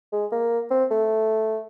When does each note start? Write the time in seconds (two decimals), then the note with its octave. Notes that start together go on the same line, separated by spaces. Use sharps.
0.12 G#3
0.32 A#3
0.71 C4
0.91 A3